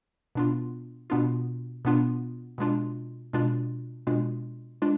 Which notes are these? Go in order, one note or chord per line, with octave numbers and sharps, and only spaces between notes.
B2 B3 D4 F4
B2 B3 D4 F4
B2 B3 D4 F4
B2 G#3 D4 F4
B2 G#3 D4 F4
B2 G#3 D4 F4
G#3 D4 F4